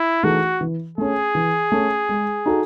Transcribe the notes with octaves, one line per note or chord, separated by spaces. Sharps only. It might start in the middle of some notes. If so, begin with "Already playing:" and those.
Already playing: E4
E3 A3 D#4 F#4 G#4
E3
A3 C#4 G#4
E3
A3 C#4
G#3
D#4 F#4 A4